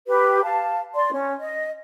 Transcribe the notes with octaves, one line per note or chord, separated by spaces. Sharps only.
G4 B4
F5 A5
D5 C6
C#4
D#5